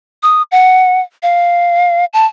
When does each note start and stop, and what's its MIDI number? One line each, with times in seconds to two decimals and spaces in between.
0.23 0.42 87
0.52 1.01 78
1.23 2.05 77
2.13 2.26 81